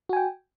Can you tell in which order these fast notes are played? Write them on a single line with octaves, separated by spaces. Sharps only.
F#4 G#5 G5